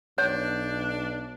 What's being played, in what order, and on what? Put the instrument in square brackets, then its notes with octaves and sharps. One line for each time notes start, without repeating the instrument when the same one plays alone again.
[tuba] B1 [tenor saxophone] D4 [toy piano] C#5